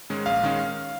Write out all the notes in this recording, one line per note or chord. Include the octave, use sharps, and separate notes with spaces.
G#2 D#3 G#3 C#4
A#1 F5
D#3 G#3 C#4